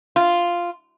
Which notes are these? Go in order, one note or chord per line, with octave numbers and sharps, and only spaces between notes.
F4